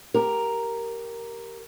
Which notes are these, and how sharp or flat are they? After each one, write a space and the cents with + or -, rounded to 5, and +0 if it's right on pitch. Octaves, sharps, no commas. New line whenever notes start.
G4 +0 A#4 +0